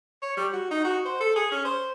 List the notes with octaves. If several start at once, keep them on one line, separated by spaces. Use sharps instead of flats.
C#5
G3
F#4
D#4
F#4
C5
A4
G#4
C#4
C5